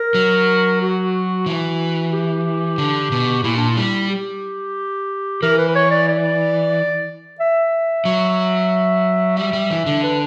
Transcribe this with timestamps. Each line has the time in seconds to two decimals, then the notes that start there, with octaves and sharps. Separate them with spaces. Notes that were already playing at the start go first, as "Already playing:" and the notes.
Already playing: A#4
0.14 F#3
0.81 F#4
1.46 E3
2.12 G4
2.78 D3
3.12 B2
3.44 A#2 E4
3.57 D4
3.69 E4
3.77 G3
4.10 G4
5.43 E3 A#4
5.58 B4
5.68 B4
5.75 C#5
5.91 D5
6.08 D5
7.40 E5
8.05 F#3
9.37 G3 E5
9.53 G3
9.70 E3
9.86 D3
10.03 B4